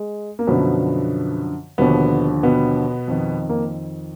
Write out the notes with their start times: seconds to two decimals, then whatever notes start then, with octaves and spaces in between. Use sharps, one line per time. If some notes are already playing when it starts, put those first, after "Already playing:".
Already playing: G#3
0.39 A#3
0.47 F#2 B2 D3 F3 B3
1.78 D#2 B2 D3 F3 B3
2.43 B2 B3
3.08 F2 D#3
3.49 A#3